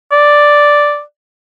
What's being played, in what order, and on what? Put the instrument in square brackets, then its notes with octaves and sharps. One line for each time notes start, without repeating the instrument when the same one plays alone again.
[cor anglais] D5